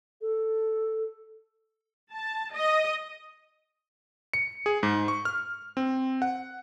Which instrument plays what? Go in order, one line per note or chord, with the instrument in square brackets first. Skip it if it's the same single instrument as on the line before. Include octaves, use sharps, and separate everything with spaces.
[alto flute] A4
[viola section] A5
D#5
[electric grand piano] C#7
G#4
G#2
C#6
F6
C4
F#5